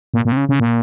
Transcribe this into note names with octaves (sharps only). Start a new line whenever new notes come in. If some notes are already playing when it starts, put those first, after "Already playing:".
A#2
A#2
C3
C#3
C#3
A#2